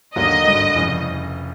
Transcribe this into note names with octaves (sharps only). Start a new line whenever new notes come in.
D#2 D3 F#3 A#3 D#5
G#1 G2 D3
F1 F2 C#3 E3